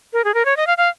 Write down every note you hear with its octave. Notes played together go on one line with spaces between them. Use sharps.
A#4
G#4
A#4
C#5
D#5
F5
F5